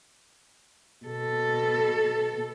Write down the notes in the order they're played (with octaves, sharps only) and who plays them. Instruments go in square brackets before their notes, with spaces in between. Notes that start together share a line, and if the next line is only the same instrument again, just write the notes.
[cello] B2 A4